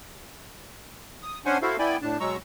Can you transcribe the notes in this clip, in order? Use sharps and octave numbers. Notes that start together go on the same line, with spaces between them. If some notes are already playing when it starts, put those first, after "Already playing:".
D#6
C#4 D4 C5 F#5 G#5
E4 F#4 A4 C5 E5 F5
B3 E4 D5 G5 G#5 B5
A2 D4 A5
B2 F#3 G#3 A#5 C#6 E6